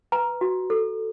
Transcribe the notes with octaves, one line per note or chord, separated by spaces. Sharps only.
B4 A#5
F#4
A4